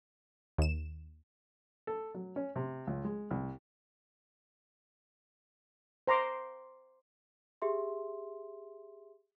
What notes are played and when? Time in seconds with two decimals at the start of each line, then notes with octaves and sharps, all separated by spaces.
0.58 D#2 E7
1.87 A4
2.15 F#3
2.36 C#4
2.56 C3
2.87 C#2
3.04 G#3
3.31 C2
6.07 C5 A#5 C6 D6
7.62 G4 G#4 E5 C6